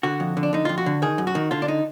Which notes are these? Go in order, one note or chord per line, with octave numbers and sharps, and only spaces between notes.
D3 F#4
F2
D3
D4
D3 D#4
F2 F4
F#4
D3
D#3 G#4
F#2
F#4
D#3
D3 F4
D4
D#4